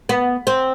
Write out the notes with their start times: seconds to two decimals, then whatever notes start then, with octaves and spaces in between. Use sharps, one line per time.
0.09 B3
0.47 C4